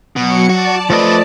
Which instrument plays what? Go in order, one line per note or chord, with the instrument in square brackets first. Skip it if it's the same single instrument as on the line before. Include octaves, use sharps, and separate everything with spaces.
[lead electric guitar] B2 [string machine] F#3 C#7
[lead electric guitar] F#4 [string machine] D5 A5
[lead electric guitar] F2 B4 [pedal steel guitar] F3 A3 D#5